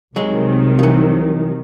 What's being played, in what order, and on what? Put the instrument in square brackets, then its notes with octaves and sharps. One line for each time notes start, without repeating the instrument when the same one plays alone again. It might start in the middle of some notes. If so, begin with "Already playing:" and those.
[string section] C2 C3 D#3 [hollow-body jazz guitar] F#3 G#3
[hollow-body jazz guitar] F3
E3 F#3